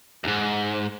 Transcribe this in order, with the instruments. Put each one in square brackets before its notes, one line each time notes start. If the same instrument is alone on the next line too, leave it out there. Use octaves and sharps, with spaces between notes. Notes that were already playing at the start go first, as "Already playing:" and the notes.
[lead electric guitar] D2 G#2